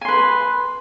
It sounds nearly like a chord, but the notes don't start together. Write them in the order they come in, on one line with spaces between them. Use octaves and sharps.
G#5 C6 B4